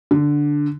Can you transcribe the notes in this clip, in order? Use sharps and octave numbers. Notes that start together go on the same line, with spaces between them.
D3